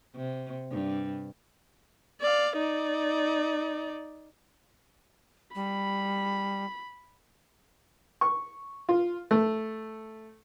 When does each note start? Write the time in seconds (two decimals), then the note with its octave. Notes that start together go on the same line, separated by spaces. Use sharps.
0.15 C3
0.70 G2
2.21 D5 F5
2.57 D#4 D5
5.55 G3 B5
8.21 C#6
8.89 F4
9.31 A3